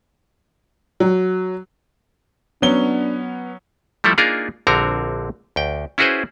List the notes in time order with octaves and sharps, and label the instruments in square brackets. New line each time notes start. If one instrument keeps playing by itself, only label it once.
[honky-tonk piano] F#3
[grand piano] F#3 C#4 G7 [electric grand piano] B3 [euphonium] D4
[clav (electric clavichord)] F3 G3 A3 E4 A4
A#3 D4 D#4 F4 G#4 A#4
A#1 D3 C4 F#4 A#4 A#5
D2 G5
C#4 E4 F#4 G#4 B4 C5